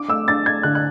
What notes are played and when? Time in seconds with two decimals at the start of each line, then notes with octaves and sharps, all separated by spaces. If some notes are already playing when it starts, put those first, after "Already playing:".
Already playing: D4 D6
0.08 A3 E6
0.27 D4 A6
0.45 A3 G#6
0.63 D3 F#6
0.75 F#6